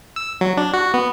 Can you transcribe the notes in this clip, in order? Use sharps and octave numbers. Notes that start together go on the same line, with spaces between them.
E6
F#3
D4
F#4
B3